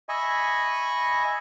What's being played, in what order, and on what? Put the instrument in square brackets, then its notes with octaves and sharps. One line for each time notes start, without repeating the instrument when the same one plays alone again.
[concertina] D#5 E5 G#5 B5 C#6